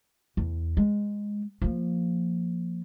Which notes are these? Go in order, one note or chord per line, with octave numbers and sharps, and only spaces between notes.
E2
G#3
F3 A#3